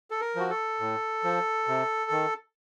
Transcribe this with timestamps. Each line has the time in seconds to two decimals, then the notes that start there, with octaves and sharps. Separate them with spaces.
0.11 A4
0.21 A#4
0.36 F3 F#4
0.50 A4
0.80 A2
1.24 F3
1.68 C3
2.11 D#3